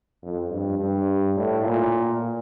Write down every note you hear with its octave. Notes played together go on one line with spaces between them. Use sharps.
F2
G2
G2
A2
A#2